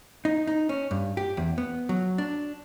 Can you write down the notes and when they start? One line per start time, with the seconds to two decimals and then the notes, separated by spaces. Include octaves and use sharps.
0.25 D#4
0.47 D#4
0.69 C#4
0.91 G2
1.17 G4
1.37 E2
1.58 B3
1.89 F#3
2.18 D4